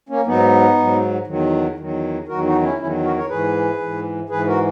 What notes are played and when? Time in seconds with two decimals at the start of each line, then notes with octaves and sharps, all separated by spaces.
0.09 A#3 C#4
0.26 G#2 F#3 B3 D#4
0.77 G#2 F#3
1.27 E2 D#3 F#3
1.78 E2 D#3 F#3
2.28 E2 D#3 F#3 F#4 A#4
2.44 D#4 F#4
2.62 C#4 E4
2.78 E2 D#3 F#3 C#4 E4
3.04 F#4 A#4
3.16 A#4 C#5
3.29 G#2 E3 G#4 B4
3.80 G#2 E3
4.29 G#2 E3 G#4 B4
4.47 F#4 A#4